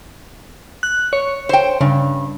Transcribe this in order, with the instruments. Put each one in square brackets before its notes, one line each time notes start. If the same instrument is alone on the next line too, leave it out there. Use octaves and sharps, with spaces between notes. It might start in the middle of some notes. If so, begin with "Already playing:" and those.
[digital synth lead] F#6
C#5
[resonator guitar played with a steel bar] C5 G5
[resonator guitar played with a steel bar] G2 [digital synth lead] C#3